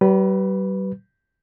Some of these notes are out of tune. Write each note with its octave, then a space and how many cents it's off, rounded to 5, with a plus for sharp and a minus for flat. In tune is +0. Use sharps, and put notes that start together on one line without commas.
G3 -40 B4 +0